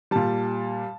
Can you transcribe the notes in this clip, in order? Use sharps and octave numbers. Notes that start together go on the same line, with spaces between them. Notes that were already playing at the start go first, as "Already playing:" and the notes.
A#2 G3 A5